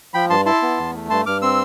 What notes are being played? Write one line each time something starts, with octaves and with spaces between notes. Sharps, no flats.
F3 G5 B5
G2 A5 C6
E4 A5 C6
B3
E2
A3
G2 A5 C6
G2 D6 F6
C4 C6 E6